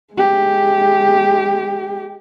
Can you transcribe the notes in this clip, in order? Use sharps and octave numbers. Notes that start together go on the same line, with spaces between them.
G#3 G4